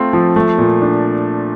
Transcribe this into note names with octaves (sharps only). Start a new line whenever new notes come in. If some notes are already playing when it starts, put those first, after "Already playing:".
Already playing: A3 C4 F4
F3
A3
A#2
D4